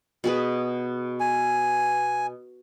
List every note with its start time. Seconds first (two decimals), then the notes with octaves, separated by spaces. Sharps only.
0.24 B2 G#4 B4
1.20 G#5